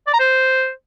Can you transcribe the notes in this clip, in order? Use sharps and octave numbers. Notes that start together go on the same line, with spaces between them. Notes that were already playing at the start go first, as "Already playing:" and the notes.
D5
A#5
C5